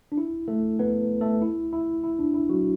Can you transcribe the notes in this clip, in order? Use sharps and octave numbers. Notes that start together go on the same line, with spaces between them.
D4
E4
A3 A4
B3 B4
A3 A4
E4
E4
E4
D4
E4
F#3 F#4